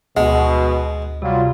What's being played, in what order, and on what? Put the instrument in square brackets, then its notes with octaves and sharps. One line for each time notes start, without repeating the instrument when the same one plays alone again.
[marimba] D2 [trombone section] B2 [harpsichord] G#3
[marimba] C3 [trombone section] F#3 G3 F4